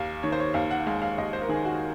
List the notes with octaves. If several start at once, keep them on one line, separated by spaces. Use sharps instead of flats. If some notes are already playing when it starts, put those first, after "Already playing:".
Already playing: D#2 F5
D#3 C#5
C5
C#5
D#2 F5
F#5
G#3 F5
F5
D#2 D#5
C5
A#4
D#3 G#4
F#4